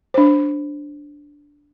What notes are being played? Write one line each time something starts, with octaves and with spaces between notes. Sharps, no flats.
D4 C5